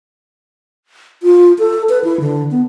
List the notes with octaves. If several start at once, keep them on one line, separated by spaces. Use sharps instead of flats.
F4
A4
B4
E4
D3
B3